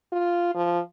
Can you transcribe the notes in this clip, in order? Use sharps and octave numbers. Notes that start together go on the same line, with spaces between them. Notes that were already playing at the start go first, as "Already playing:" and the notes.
F4
F3